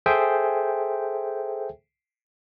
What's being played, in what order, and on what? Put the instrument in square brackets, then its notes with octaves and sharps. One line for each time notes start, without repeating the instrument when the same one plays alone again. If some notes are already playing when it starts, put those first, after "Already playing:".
[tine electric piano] G#4 A4 C5 E5 G5 G#5